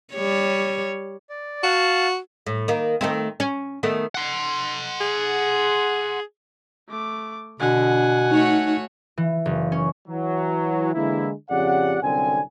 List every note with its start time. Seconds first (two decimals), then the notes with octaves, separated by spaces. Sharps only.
0.14 G3 C#5
1.29 D5
1.63 F#4 F5 F#5 A5
2.47 A2
2.68 D#3 A#3
3.01 D#3 A3 C4
3.40 C#4
3.83 D#3 A3 B3
4.15 F#5 C6
5.01 G#4
6.89 A3 D6
7.60 B2 D3 F#5 G#5
7.92 D4
8.31 A3 D#4 F#4 C#5
9.17 E3
9.46 F#1
9.72 C#4
10.08 E3 F#3
10.94 D3 E3 G#3 A#3 E4
11.50 F2 C#3 G4 D5 F#5
12.02 C2 F#2 D3 C4 G#5